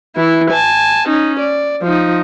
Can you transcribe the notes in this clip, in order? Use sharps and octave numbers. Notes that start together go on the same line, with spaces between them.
E3 E4
G#5 A5
C#4 D#4
D5
F3 D#4